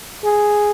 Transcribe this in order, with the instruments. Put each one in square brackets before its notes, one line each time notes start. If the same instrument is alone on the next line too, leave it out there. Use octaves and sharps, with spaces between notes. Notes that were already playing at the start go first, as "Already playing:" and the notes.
[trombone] G#4